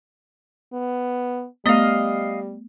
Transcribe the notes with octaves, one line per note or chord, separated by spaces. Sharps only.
B3
G3 A3 B3 D#5 F5